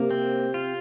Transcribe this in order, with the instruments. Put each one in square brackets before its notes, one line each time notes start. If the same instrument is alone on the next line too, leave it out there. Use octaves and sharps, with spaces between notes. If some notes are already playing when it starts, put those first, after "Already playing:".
Already playing: [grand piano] C3 [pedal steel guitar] A#3
[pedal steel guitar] C4
F4